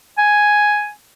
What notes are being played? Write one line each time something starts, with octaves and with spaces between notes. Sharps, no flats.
G#5